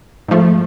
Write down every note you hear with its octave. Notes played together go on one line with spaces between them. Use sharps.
G#2 F3 A3